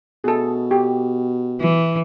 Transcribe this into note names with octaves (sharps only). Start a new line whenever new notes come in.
B2 G#4 A4
G4
E3